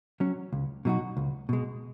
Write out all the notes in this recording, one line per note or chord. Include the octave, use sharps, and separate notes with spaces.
F#3 C#4
C#2
B2 F#3 D#4 F#4
C#2
B2 G#3